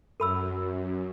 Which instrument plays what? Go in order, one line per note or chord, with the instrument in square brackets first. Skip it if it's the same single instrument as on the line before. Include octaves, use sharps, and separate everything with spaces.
[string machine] F#2 [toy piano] A4 B5 E6